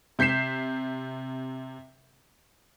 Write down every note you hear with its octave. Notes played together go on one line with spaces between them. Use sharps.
C3 G6 B6 C7 E7